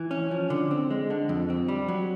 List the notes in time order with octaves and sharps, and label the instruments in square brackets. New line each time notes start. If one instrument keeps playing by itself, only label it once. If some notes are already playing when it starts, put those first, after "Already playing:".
Already playing: [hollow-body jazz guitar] E3
C#4
F3
D3
C4
G#3
D3
F2
C4
G3
F#3